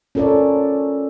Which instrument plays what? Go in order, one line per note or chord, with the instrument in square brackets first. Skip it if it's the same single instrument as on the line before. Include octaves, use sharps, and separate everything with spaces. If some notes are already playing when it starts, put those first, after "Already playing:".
[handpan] C#4 F4 A4 A#4 C#5 D5